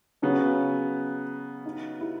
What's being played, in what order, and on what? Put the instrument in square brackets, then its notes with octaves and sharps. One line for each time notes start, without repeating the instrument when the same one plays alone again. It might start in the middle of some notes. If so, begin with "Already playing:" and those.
[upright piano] C#3 F#3 B3 [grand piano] C#4
[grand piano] D#4
E4